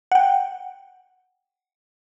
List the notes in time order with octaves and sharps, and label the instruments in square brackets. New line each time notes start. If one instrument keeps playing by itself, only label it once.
[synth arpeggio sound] F#5 G5